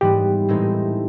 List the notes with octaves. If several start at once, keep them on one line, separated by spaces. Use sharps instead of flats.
G#2 E3 G3 B3 G4
A2 E3 G#3 C4 D#4